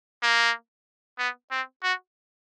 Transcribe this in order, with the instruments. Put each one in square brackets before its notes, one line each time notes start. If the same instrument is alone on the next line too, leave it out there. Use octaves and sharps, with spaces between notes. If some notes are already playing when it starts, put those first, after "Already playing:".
[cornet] A#3
B3
C4
F#4